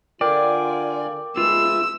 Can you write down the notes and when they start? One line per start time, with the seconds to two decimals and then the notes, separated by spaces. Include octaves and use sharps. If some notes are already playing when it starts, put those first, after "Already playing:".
0.21 D3 F4 A#4 D5 G5 G#5 D6
1.37 G#3 F4 B4 E5 E6